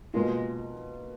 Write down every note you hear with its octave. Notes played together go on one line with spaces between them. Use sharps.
B2 G#3 A#3 F4